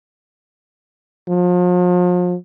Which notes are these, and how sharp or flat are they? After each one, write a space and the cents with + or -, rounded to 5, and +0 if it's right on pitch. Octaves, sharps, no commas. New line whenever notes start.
F3 +40